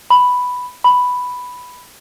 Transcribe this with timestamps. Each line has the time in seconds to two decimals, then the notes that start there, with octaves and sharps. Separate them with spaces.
0.10 B5
0.84 B5